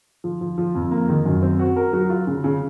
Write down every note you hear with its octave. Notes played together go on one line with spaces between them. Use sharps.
F3
F3
F3
F2
A#3
D#3
F#2
C4
F#4
A#4
F#3
F4
C#3
C#3